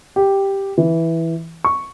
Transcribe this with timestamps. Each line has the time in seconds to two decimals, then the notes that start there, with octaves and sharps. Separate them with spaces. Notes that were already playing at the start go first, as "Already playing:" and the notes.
0.16 G4
0.78 E3
1.64 C#6